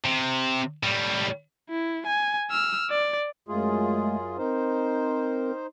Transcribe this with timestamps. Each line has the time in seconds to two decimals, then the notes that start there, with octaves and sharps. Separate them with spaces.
0.06 C3
0.83 A2 G3
1.69 E4
2.07 G#5
2.51 E6 F6
2.90 D5
3.48 F#2 G#3 A3 F4 G#4
4.38 C4 D#4 A#4 C5